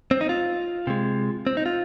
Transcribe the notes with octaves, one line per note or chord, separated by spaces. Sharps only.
C4
D#4
F4
C3 G#3
C4
D#4
F4